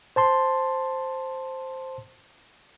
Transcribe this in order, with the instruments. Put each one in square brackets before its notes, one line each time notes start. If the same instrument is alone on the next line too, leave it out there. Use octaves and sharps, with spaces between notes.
[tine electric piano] C5 A5 C6